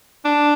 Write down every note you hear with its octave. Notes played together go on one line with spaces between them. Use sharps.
D4